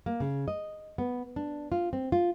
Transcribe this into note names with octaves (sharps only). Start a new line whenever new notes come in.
A#3
C#3
D#5
B3
D4
F4
C4
F4